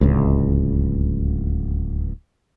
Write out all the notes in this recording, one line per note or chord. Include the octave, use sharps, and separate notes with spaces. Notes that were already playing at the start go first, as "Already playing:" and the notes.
D1 C#2